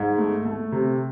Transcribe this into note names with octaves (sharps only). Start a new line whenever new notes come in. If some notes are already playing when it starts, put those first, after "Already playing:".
Already playing: G#2
A3
A3
C3